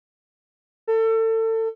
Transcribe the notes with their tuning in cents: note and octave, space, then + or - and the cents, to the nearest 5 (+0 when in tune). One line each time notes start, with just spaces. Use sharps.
A4 +30